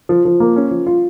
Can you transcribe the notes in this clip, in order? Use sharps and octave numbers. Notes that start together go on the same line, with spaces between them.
F3
F3
A#3
C#4
F3
F4